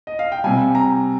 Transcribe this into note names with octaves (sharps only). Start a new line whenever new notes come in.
D#5
F5
G5
C3 G3 G#5
A#5